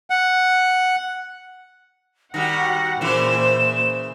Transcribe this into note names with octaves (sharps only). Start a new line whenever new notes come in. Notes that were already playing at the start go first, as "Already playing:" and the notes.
F#5
D#3 G3 F#4 F#5 A#6
A#2 C#3 E3 C5 E7